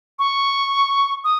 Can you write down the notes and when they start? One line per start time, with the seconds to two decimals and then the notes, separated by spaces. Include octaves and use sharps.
0.19 C#6
1.24 D#6